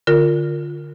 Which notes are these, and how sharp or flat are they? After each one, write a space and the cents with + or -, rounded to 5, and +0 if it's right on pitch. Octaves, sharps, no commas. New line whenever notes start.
D3 +0 F4 +0 A#4 -15